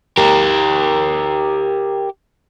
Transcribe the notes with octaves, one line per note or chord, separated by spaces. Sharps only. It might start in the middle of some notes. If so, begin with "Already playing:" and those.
G4 A#4